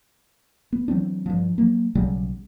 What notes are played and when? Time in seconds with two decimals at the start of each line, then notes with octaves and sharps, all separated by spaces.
0.73 B3
0.88 E3 F#3 C4 D4
1.26 G2 F3
1.58 F#3 A#3
1.95 B1 C#3 F#3 G3